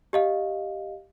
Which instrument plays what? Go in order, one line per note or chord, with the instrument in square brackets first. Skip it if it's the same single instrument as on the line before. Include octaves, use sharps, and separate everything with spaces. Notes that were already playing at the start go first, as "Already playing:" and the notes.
[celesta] G4 D#5 F5